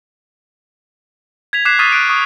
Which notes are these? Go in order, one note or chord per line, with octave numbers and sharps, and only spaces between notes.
G#6 B6 F7
D6 F#6 G#6 B6 C7 E7
C#6 D#6 F6 A6 B6 D#7
F#6 D7
C#6 D#6